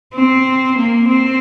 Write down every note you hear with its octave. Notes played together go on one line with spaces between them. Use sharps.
C4
A#3
C4